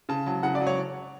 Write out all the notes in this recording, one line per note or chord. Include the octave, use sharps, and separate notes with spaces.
C#3 A5
F#3 A5
C#3 F#5
D5
F#3
C#5